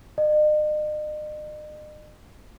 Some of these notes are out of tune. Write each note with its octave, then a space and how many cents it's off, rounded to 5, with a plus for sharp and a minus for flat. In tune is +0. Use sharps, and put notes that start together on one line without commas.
D#5 -45